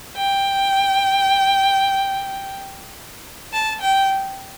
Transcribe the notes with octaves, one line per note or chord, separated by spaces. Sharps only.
G5
A5
G5